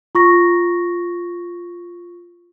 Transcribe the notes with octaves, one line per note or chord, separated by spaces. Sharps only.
F4 C#6 A#6